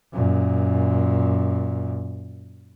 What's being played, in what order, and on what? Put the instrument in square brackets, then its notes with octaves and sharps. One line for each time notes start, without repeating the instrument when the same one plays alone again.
[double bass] F#2 A#2